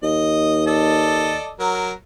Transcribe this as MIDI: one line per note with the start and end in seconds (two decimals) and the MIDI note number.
0.03 1.39 39
0.03 0.67 75
0.67 1.53 69
0.67 1.53 74
0.67 1.53 75
1.60 1.92 54
1.60 1.92 70